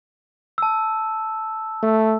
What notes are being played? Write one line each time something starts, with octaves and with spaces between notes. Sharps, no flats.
A5 E6
A3